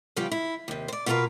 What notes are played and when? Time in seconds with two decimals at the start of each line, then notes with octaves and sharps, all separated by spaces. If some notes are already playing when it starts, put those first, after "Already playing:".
0.16 C#3 F3 G3 B3 F4 G4
0.31 E4
0.68 D#2 C3
0.88 C5 D5
1.06 B2 A#3 F4 G#4 A#4 B4